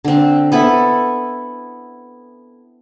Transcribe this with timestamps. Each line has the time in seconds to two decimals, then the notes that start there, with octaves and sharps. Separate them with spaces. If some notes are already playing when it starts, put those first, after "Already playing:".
0.05 D3 C4
0.52 B3 E4 A4 E5